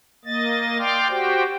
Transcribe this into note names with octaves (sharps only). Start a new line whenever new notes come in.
A#3 D#5 A6
D5 G5 C6 D6 F6
F#4 G4 C5 G5